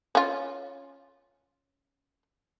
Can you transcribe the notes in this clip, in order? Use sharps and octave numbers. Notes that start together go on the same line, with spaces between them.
C#4 F4